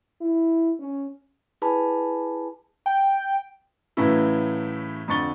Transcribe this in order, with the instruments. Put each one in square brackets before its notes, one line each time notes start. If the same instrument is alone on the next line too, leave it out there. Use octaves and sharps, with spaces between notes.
[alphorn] E4
C#4
[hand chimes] E4 G#4 B4 G#5 A5 B5
[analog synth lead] G5
[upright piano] A2 C#3 E3 F#3 C#4 E4
F2 D3 C#6 A6 G7